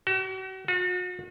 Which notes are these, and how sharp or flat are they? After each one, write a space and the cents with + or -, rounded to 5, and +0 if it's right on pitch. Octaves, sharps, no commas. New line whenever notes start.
F#4 +40
F#4 -40